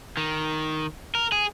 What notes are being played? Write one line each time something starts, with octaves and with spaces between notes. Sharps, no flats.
D#3
A#4
G#4